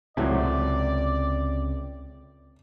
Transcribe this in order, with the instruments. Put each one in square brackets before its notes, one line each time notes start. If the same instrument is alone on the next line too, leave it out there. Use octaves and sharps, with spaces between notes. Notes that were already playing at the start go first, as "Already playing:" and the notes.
[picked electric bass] C#2 C3 [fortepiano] A2 F#3 [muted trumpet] D5